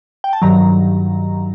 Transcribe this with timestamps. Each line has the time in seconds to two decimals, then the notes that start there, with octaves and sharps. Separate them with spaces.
0.24 G5
0.33 A5
0.42 G2 D#3 F#3 A#5